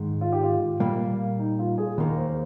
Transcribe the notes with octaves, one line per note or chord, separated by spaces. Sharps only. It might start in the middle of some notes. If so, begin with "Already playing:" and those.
Already playing: G#2 D#3 G#3
F4
G4
F4
A#2 G3 A#3
D#4
F4
G#4
D#2 D#3 A#3 A#4
C5